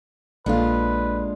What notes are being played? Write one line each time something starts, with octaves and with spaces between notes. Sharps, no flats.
A#1 G#3 A#3 D4 F4 A4 B4 F5